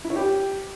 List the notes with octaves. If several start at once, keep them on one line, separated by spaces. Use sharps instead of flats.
E4
C#5
G4